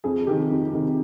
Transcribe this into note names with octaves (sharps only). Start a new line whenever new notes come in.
F2 G#4
C3 D#3 G4
F2
C3 D#3